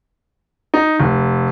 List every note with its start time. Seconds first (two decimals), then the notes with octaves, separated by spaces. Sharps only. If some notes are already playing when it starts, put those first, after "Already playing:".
0.74 D#4
1.00 F1